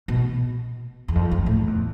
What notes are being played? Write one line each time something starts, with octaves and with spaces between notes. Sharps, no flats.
B2
E2
F2
F2
A2
F2
E2